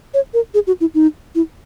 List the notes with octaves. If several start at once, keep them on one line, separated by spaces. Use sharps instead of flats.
C#5
A#4
G#4
F#4
E4
D#4
E4